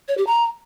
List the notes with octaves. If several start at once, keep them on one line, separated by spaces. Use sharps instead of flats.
C#5
G4
A#5